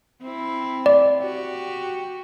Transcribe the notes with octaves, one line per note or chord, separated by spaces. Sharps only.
C4 E4
D5
F#4 G4